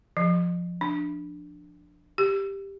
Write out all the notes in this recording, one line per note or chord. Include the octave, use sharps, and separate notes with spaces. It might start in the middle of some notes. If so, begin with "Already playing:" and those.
F3
D4
G4